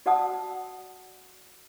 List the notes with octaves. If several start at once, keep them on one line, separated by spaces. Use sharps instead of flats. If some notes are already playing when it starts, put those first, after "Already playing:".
F#4 D5 F#5 A5 D#6 E6